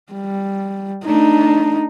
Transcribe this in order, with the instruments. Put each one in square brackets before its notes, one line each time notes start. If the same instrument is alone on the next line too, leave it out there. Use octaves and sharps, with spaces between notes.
[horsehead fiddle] G3
[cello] A3 D4 [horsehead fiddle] D#4